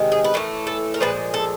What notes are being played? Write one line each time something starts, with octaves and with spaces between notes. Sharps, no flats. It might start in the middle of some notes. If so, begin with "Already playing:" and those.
Already playing: C3 D#3 G#3
G#4
B4
A2 E3 A3 A#4
A4
A#4
A#2 F3 G#3 B4
A4